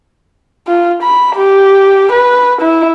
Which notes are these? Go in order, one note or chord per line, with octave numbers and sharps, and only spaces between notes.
F4
B5
G4
B4
E4